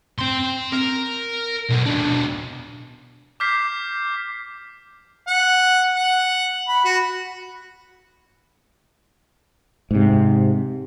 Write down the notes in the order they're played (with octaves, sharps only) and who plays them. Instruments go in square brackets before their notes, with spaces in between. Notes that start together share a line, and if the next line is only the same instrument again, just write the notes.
[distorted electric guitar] C4 C6
A#4
B1
B2 D4
[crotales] D6 F6 G6 B6 C7
[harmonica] F#5
F#5
B5
F#4
[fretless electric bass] G#2 C3